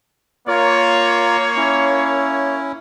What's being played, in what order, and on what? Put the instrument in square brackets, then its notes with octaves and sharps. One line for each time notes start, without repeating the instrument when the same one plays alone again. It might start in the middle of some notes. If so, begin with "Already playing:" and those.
[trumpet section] A#3 C#5 [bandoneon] F4 A#4
[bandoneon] C#4 E4